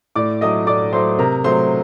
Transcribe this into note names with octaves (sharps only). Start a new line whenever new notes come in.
A2 D5 D6
F#3 A3 D#5 D#6
A2 D5 D6
F#3 A3 C5 C6
C3 A#4 A#5
F#3 A3 C5 C6